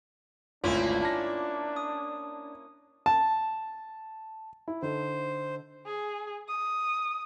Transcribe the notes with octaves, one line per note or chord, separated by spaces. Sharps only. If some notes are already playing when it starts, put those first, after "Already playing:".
G#1 D2 A#3 C#4 D4 E4 F4
A5 A#6
D#6
A5
E4
D3 D#4 A4 C5
G#4
D#6